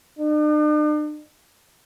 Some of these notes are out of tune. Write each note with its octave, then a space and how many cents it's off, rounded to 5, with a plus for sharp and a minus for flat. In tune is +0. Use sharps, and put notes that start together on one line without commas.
D4 +45